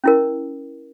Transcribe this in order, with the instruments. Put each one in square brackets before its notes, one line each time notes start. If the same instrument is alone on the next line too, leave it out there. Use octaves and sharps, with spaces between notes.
[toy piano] C#4 E4 A#4